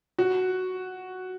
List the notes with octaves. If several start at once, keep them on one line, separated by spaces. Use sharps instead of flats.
F#4